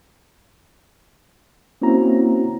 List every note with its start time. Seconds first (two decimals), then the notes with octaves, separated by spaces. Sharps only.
1.82 A#3 C4 C#4 E4 F#4 A#5